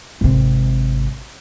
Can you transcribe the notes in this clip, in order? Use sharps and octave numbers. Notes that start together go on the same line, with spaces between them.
G#1 C3